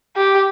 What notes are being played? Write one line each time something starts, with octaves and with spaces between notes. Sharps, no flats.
G4